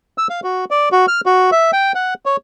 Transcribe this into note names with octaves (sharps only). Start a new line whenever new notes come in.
E6
F5
F#4
D5
F#4
F6
F#4
E5
G5
F#5
C#5